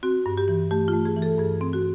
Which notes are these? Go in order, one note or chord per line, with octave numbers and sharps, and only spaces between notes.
C4 F#4
G2
G4
E3
A3 G4
F4
A3
G#4
E3
A4
G2 G#4
C4
F#4